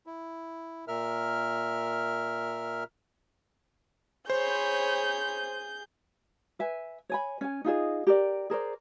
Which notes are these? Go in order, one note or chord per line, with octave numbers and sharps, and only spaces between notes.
E4
A#2 A#4 E5 F6
G#4 C5 C#5 B5 G6
B4 E5 G#5
C#5 G#5 B5
C#4 G#5
D#4 F4 G#4 D#5
G4 A#4 D5
G#4 A#4 C5 D5